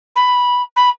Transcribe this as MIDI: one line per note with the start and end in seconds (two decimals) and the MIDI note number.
0.16 0.62 83
0.76 0.89 83